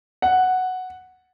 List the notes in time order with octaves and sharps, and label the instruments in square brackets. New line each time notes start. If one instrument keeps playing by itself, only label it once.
[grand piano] F#5